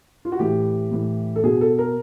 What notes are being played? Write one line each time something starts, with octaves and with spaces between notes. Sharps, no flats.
F4
F#4
A2 E3 G4
A2 E3
A4
B2 G#4
A4
A#4